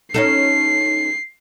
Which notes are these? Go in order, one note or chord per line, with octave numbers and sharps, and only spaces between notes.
C#4 D#4 A4 C7